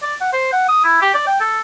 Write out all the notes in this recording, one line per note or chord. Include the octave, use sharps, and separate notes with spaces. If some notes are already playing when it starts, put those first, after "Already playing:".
D5
F#5
C5
F#5
D#6
E4
G4
D5
G5
A4